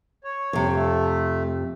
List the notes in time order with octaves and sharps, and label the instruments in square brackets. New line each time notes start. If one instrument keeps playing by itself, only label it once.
[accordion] C#5
[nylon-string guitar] F2 C3
[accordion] A3